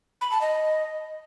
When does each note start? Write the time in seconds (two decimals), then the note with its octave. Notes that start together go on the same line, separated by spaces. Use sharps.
0.21 B5
0.31 A5
0.41 D#5